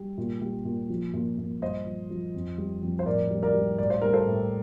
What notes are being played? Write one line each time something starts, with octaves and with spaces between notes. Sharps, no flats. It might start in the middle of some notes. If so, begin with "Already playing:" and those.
Already playing: G3
A#2
G3
A#2
F3
A#2
A#2
G2 C5 D#5
F3
F3
F2
G3
F2
C5
A2 A#4 D5
G3
A#4 D5
G3
A2 D5
C5
G3 A#4
A4 C5
A2